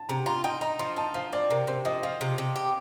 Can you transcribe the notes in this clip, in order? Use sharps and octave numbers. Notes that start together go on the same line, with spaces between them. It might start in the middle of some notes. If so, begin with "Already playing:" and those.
Already playing: A5
C3 A#5
F4 A#5
D#4 G5
D#4 A#5
F3 C6
D#4 A5
F3 F5
C4 D5
C3 A#4
C3 C5
F3 D#5
F3 F5
C3
C3
G4